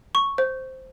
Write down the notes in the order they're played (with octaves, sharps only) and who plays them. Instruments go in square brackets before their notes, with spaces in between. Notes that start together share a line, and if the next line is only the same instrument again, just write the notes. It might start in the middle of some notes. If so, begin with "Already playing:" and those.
[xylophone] C#6
C5